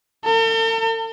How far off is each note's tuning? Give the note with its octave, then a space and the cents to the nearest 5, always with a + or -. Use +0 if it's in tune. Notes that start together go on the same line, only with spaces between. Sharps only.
A4 +45